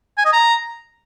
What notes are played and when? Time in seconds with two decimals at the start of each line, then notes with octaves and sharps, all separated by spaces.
0.18 G#5
0.25 D#5
0.33 A#5